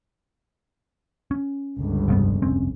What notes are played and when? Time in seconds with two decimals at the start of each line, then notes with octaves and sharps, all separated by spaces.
1.31 C#4
1.77 G1 C#2
2.08 F1 G2 B3
2.42 F1 C4 C#4